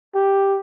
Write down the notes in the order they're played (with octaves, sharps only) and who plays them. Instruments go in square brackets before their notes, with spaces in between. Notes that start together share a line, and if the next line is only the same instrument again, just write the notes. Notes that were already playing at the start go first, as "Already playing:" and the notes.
[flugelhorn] G4